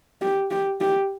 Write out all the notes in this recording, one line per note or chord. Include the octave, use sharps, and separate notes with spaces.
G4
G4
G4